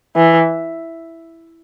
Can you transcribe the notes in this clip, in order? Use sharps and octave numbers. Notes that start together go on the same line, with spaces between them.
E3